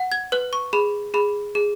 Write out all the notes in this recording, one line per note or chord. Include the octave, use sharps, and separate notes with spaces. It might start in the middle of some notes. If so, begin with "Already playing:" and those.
Already playing: F#5
G#6
B4 F#6
C#6
G#4 B5
G#4 B5
G#4